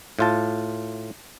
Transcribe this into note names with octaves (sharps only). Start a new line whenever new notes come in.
A2 F4 A5